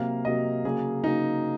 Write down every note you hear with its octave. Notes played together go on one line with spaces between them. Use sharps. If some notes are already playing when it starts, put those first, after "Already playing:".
Already playing: C3 F#3 A#3 F5
C3 F#3 A#3 D#5
C#3 F#3 A#3 G#4
C#3 F#3 A#3 D#4